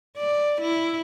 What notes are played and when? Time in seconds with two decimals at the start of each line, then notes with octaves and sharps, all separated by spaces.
0.18 D5
0.62 E4